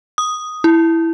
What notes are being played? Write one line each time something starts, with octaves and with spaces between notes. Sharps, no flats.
D#6
E4